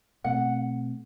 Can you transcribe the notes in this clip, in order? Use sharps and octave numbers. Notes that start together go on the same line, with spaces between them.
B2 A3 C4 F#5